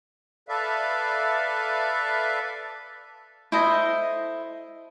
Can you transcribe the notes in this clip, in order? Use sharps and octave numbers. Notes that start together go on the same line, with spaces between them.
A4 B4 D5 E5 F5
E4 A4 C5 D#5